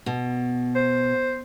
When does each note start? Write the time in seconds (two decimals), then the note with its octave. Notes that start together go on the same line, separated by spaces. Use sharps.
0.06 B2
0.75 C5